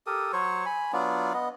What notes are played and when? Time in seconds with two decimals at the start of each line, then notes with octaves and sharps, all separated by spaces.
0.07 G4 A4 A#4 D#6
0.33 F#3 C5 C#5 C#6
0.66 G#5 B5
0.93 F#3 B3 D4 F4
1.33 B3 D#5